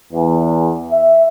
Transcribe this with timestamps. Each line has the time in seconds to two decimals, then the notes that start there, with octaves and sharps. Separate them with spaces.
0.12 E2
0.91 E5